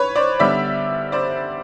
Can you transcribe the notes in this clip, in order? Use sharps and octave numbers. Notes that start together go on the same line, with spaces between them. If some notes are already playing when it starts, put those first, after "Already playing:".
Already playing: B4 C#5
C5 D5
D3 G3 B3 D5 E5
C5 D5